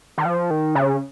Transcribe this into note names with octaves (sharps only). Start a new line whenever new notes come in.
D#3
F3
D#3
C#3